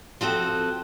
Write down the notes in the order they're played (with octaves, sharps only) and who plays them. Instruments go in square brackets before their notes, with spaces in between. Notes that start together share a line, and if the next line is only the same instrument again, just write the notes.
[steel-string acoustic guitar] F3 C4 F#4 A4